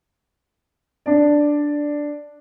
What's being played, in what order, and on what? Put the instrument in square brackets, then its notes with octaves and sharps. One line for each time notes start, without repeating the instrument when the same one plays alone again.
[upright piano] D4 D5